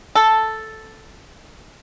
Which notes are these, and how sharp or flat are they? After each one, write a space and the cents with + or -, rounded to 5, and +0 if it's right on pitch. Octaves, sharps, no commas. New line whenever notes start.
A4 +0